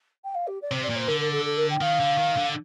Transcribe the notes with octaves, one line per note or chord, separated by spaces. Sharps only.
G5
F5
G4
D5
C3 C5
D5
A#2
C5
D3 A#4
A#4
A4
A4
A#4
G5
D#3 F5
D3
D#3
D3